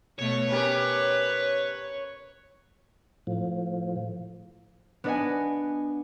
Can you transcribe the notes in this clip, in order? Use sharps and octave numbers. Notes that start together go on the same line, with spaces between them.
B2 A3 C#5
C#4 G4 A#4 B4
A2 F3
B3 D4 B4 D#5 F#5 G#5